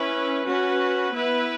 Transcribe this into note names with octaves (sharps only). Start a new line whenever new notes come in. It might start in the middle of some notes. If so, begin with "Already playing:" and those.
Already playing: C#4 E4 B4
C#4 F#4 B4
B3 E4 B4